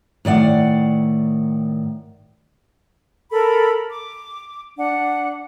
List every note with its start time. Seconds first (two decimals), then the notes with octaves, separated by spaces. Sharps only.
0.25 A2 D#3 D5 F#5
3.31 A4 A#4 B5
3.91 D6
4.78 D4 F#5